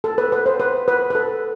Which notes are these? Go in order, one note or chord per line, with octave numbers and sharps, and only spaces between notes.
A4
B4
B4
C5
B4
B4
B4
A4